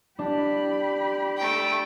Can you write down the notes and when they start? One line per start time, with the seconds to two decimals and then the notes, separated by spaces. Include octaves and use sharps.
0.19 D4 G4 B5
1.37 A3 G5